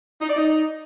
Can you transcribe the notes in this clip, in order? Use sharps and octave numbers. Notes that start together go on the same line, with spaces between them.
D#4
D5
D#4